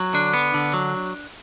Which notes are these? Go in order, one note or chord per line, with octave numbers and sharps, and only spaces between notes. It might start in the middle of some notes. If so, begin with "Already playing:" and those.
Already playing: F#3
D3 D4
B3
D3
F#3